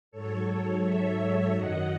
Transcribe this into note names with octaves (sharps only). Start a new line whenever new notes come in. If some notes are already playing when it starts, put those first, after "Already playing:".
G#2 F#3 A4 C#5
C#5 E5
F#2 D#3 F#3 D#5 F#5